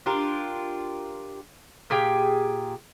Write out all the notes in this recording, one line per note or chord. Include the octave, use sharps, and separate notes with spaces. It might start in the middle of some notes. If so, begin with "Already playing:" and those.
D4 F4 G4 A#4
A#2 G4 G#4 G5